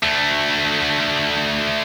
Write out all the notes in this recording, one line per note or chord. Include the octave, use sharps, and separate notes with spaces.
D2 A3